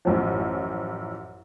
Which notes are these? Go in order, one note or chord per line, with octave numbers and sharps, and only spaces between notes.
A1 F#2 F3